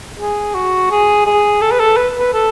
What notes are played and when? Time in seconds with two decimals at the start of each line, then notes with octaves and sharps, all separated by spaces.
0.19 G#4
0.54 F#4
0.90 G#4
1.26 G#4
1.61 A4
1.71 B4
1.80 A4
1.97 B4
2.19 B4
2.33 A4